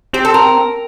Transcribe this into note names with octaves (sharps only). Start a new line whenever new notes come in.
C4 G4
A4
A#4